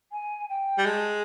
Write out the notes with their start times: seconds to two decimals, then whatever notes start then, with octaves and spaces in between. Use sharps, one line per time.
0.12 G#5
0.49 G5
0.78 G3
0.86 G#3 A5